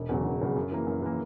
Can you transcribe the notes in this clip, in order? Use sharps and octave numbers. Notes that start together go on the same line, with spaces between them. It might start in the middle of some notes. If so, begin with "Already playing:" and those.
Already playing: E1
E2 C#3 F#3
E1
E2 C#3 F#3
F#2
E3 A#3
F#2
E3 A#3